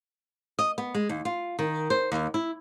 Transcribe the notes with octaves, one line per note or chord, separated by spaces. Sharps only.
D#5
B3
G#3
D#2
F4
D#3
C5
D#2
E4